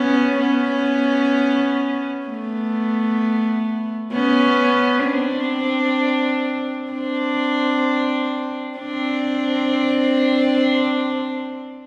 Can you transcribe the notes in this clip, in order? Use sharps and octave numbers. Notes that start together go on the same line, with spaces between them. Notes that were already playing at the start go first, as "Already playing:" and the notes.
Already playing: B3 C#4
B3 C#4
A3 B3
B3 C#4
C4 D4
C4 D4
C4 D4